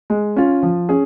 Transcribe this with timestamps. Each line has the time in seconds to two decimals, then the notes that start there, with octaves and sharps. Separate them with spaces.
0.10 G#3
0.36 C#4 F4
0.63 F3
0.89 C#4 G#4